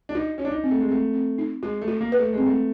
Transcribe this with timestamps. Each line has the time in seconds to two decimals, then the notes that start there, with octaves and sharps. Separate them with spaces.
0.09 D4
0.15 D#4 F#4
0.38 C#4 F#4
0.45 D4
0.52 D#4
0.64 C4
0.71 A3
0.81 G#3
0.89 A3 C4
1.13 C4
1.38 D#4
1.63 G#3 F#4
1.82 A3
1.88 F#4
2.01 A#3
2.12 B4
2.18 A3
2.33 G#3 C4
2.46 A3